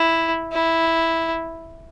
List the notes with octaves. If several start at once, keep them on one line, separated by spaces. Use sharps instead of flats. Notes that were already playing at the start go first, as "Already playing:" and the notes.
Already playing: E4
E4